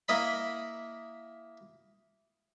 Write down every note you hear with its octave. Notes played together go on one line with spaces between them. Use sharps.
A#3 E4 D#5 B5